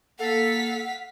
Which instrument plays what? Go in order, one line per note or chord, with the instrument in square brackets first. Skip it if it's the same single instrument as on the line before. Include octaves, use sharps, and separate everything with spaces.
[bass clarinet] A#3 [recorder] A4 [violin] F5 B6 [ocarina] F#5